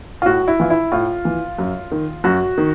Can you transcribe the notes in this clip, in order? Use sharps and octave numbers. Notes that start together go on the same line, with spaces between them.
F4
A2 F#4
E4
E3 F4
E4
A2 F4
E3
F#2
D#3
F#2 F#4
D#3